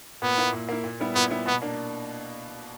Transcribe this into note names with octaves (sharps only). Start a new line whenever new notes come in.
A#2 B3
A#3 E4
A#2
A#3 E4
A#2
G3 B3 E4
A#2 B3
G3 B3 E4
B2 B3
A#3 D4